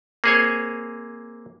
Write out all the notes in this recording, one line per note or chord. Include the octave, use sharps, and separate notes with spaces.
A#3 C4 G#4 C5 C#5 G#5